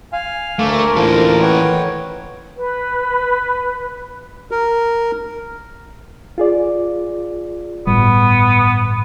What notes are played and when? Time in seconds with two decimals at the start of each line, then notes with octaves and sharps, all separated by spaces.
0.13 F5 G#5
0.59 D2 A3 A#3 A#4
0.96 E3 A#3 F4 A4 C5
1.41 B4 C#5 F#5 G5
2.57 B4
4.51 A#4
6.38 F4 G#4 D5
7.87 G1 A2 G3 B3